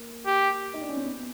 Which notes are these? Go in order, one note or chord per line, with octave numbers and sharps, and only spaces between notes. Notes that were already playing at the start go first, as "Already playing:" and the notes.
Already playing: A#3
G4
D#4
D4
C#4
C4
B3